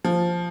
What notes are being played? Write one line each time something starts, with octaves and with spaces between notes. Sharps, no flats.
F3